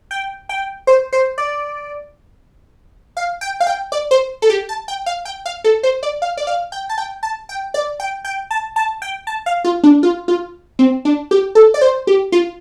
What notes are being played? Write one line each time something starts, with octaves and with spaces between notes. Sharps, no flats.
G5
G5
C5
C5
D5
F5
G5
F5
G5
D5
C5
A4
G4
A5
G5
F5
G5
F5
A4
C5
D5
F5
D5
F5
G5
A5
G5
A5
G5
D5
G5
G5
A5
A5
G5
A5
F5
F4
D4
F4
F4
C4
D4
G4
A4
D5
C5
G4
F4